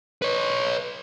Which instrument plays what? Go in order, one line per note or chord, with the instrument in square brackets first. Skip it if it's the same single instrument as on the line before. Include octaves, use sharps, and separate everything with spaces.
[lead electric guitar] B4 C#5